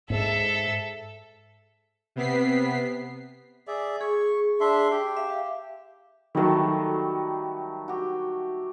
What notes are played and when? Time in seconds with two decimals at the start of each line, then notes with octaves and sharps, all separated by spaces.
0.10 G#2 A4 E5
2.16 C3 B3 B6 C7
3.67 G#4 D5 E5
4.01 G#4 C#6
4.60 D4 E5 C6
4.91 G4
5.17 E5 F5
6.35 D#3 F#3 G3 A3
7.88 F#4 G4